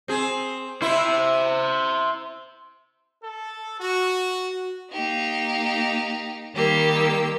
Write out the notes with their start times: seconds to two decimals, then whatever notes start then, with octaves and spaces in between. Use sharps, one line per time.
0.08 C4 G#4
0.82 E4 C5 E5
3.24 A4
3.81 F#4
4.91 A#3 D#4 G4
6.55 D#3 G3 A#3 G4 E6